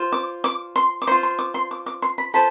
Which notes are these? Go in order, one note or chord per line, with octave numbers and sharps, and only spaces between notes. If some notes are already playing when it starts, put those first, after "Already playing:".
Already playing: F4 C5
D6
D6
C6
D6
F4 C5 C6
C6
D6
C6
D6
D6
C6
B5
F4 A4 C5 B5